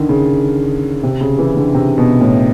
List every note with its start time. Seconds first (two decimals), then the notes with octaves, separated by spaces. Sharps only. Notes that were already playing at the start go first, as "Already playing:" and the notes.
Already playing: D3 D#3
0.09 C#3
1.03 C3
1.21 C#3
1.39 E3
1.56 D3
1.74 C3
1.98 B2
2.21 A2